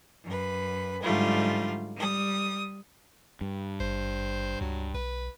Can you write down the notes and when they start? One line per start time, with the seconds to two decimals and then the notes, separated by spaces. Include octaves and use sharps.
0.25 F#2 B4
1.01 G#2 D3 F#3 G3 A3 F4
1.96 G3 D#6
3.41 G2
3.80 G#1 C5
4.61 C#2 F#3
4.94 B1 B4